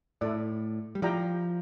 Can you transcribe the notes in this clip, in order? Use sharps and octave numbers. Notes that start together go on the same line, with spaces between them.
A2 E4 A4 D5
G3
F3 E4 G4 D5 G5 A#5